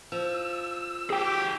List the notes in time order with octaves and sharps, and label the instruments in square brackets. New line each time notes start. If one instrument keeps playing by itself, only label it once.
[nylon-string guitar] F3 [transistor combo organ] E6
[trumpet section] G4 [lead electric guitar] G#4 G5